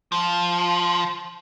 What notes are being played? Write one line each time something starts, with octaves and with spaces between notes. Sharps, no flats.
F3